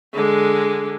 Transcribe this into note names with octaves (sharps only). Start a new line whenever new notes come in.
D3 G#3